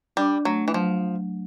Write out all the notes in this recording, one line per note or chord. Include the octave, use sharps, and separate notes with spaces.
G3 D4
F#3 A3
E3
F3 F#3